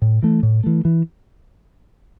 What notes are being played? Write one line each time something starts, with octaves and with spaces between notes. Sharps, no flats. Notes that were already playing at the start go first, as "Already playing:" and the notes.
A2
E3 A3
A2
E3 A3
E3